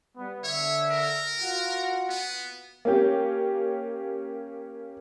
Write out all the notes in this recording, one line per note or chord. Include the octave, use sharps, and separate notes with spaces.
G3 B3
D3 C#5 E5
A#4
F4 F#4 F#5
B3
A#3 C#4 G4